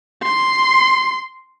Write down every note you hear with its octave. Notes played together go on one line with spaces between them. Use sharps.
C6